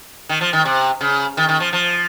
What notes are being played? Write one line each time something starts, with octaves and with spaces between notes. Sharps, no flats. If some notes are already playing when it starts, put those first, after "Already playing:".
D#3
F3
D#3
C3
C#3
D#3
D#3
F3
F3